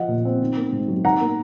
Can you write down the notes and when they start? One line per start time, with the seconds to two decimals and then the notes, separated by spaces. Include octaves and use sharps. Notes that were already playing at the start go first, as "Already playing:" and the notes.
Already playing: F3 F4 D#5 F#5
0.08 A#2
0.25 C4
0.41 D#3
0.56 A#3
0.72 G#2
0.88 F#3
1.04 D#3 F#5 A#5
1.21 A#3